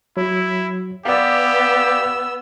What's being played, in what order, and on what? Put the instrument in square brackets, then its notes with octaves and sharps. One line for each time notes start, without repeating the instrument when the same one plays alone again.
[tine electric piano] F#3 [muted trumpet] E4
[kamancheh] B3 E6 [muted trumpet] G4 [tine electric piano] D5 F5